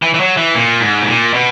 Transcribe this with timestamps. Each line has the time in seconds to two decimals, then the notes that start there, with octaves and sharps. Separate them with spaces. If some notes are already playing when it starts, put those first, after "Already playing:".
0.02 E3
0.14 E3
0.20 F#3
0.37 E3
0.55 A#2
0.81 G#2
1.02 B2
1.08 A#2
1.34 B2